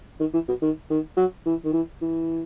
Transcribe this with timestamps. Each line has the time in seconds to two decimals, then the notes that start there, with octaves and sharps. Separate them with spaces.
0.20 D#3
0.34 E3
0.48 B2
0.62 D#3
0.90 D#3
1.17 F#3
1.46 E3
1.65 D#3
1.73 E3
2.01 E3